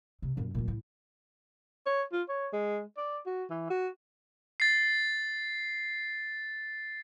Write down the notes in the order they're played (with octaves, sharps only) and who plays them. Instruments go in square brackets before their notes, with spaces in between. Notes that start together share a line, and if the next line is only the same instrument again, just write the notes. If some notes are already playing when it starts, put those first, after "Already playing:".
[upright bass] C3
F#2 A#2
A#2 F#3
A2
[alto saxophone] C#5
F4
C#5
G#3
D5
F#4
E3
F#4
[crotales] A6 C7